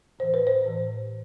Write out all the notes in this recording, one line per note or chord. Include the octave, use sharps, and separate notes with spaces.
A2 E3 C5
B4
C5
A2 E3